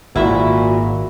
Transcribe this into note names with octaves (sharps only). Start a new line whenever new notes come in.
G#1 A#2 E4 F#4 E5